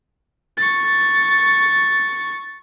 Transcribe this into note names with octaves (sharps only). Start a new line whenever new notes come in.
C#6 A6